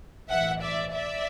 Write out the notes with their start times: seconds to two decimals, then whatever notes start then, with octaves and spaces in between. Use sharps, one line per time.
0.30 B1 A2 E3 E5 F#5
0.62 D5 E5
0.93 D5 E5